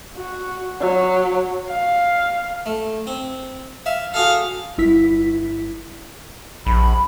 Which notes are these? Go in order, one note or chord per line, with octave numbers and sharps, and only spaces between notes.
F#4
F#3
F5
A3
C4
E5 F5
F#4 G#4 A4 F5
G1 E4 B6
A#1 B5